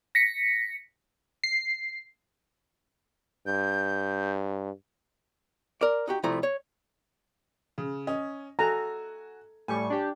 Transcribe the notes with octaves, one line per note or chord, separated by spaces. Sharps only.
A#6 B6 C#7
C7
G2 G6
A#4 D5
D#4 F#4 G4
C2 F3 A3 E4 A#5
C#5
C#3
C#4 D#5
F#4 A4 G#5 A#5
A2 G3 G#5 C#6
D4 G4